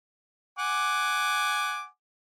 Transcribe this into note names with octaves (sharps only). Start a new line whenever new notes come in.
F#5 G#5 D6